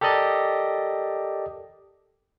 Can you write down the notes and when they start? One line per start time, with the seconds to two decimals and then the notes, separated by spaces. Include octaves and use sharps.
0.01 G4 A4 A#4 D5 D#5